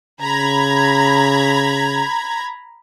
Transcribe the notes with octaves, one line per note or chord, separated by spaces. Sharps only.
C#3 A#5 B5 G#6